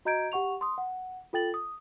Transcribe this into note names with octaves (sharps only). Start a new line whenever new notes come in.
F#4 D#5 A#5 G6 G#6 D7
G4 F#5 C#6 F7
C6 D#6
F#5
F4 A4 G5 A6 F#7
D#6